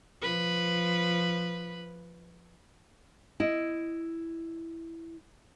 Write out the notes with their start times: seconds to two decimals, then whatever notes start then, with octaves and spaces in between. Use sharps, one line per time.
0.22 F3 B4
3.40 E4 D#5